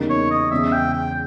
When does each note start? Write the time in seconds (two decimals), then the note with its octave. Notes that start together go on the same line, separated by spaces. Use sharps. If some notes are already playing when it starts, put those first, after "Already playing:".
Already playing: E2 C#3 G3 A#3 D#4
0.10 C#5
0.31 D#5
0.51 E2 C#3 G#3 E5
0.72 G5
0.93 G5